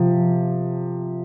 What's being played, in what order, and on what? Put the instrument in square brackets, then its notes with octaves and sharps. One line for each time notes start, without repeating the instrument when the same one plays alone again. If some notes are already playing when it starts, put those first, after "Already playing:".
Already playing: [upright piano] C3 F3